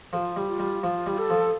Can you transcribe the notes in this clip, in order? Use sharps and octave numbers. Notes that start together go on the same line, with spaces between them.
F3 F4 A4
G3
F4
G3
F3 F4
G3
A4
F3